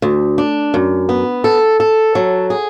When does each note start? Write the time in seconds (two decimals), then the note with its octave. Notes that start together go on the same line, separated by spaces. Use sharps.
0.02 D2
0.38 D4
0.74 F#2
1.09 B3
1.44 A4
1.80 A4
2.15 F#3
2.50 G#4